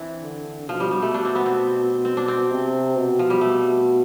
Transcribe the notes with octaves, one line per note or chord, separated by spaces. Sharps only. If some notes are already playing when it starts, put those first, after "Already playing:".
Already playing: E3 C4 D4
D3
B2 F3
G3
G3
A3
B2 D4
C4
B3
C4
C4
D4
C4
C3
B2
F3
G3
A3